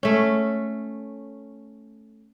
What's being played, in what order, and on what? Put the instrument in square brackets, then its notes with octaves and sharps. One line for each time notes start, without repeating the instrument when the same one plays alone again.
[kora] A3 C#4